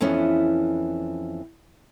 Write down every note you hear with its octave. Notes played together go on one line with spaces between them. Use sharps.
F2 E3 B3 C#4